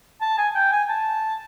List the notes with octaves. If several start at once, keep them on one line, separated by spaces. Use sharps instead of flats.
A5
G#5
G5
G#5
A5